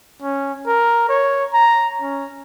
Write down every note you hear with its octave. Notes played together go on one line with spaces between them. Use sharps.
C#4
A#4
C#5
A#5
C#4